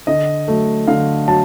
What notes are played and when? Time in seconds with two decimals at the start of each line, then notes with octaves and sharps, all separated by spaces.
0.07 D3 D#5
0.48 F#3 A3
0.87 D3 F5
1.28 F#3 A5